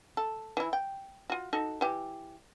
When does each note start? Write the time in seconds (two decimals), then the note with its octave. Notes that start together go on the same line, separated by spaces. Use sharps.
0.17 A4
0.57 E3 E4
0.73 G5
1.30 F4 F#4
1.53 D#4 F#4 A4
1.81 E3 G4